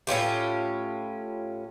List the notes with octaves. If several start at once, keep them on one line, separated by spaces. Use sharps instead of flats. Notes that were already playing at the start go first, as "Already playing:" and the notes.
A2 C#4 F4 G4